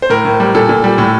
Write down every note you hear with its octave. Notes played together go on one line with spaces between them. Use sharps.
C5
A2 A#4
A2
G3
A#2 A4
A#2
G3
A2